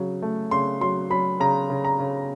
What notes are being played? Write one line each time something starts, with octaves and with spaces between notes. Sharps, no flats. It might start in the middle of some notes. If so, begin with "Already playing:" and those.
Already playing: C#3 F#3
A3
C#3 C6
F#3 C6
F#3 B5
C#3 A#5
C#3
A#5
C#3